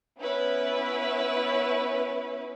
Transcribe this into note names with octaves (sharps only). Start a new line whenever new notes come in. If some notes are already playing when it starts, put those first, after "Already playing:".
B3 C#4 E4 B4